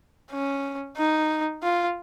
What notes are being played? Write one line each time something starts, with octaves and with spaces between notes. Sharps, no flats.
C#4
D#4
F4